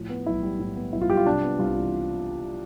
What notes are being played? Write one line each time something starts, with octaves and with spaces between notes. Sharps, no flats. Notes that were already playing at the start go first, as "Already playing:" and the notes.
Already playing: A2 F3
B3
B1 E4
G3
A2
B3
B1 E4
F4
G3 G4
F4
C3 D4
B3
C2 F4
E3